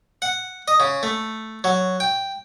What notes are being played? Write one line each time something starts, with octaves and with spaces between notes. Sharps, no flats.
F#5
D#5
C#3
A3
F#3
G5